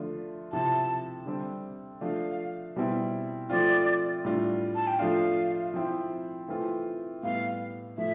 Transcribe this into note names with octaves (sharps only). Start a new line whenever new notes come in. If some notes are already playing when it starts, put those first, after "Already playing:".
Already playing: D3 F3 A3 D4 F4
C3 F3 C4 E4 A5
D3 G3 C4
F3 A3 D4 F5
B2 G3 C4 E4
F3 A3 C4 F4 D5
A2 G3 D4 F4
A5
G5
F3 A3 D4 F4 F5
F3 C4 E4
E3 A3 C4 F4
A2 G3 B3 F5
A2 F3 A3 E5